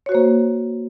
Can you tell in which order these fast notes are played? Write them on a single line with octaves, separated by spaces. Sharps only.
C#5 F#4 C5 A#3